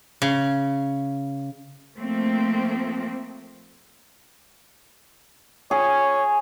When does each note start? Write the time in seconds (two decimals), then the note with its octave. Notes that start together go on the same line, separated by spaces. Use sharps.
0.22 C#3
1.97 F3 A3 A#3 C4
5.71 G#4 C#5